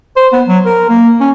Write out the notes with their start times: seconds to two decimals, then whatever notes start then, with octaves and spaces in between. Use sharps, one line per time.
0.16 C5
0.33 B3
0.47 F#3
0.66 A#4
0.89 A#3
1.21 C#4